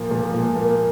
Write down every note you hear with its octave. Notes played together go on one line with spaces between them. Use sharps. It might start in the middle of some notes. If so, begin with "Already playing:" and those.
Already playing: A#2 F3 A#3
A#2
A#2
A#3